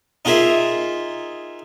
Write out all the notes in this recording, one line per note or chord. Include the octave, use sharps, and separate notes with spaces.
D#4 F4 G#4 A#4 E5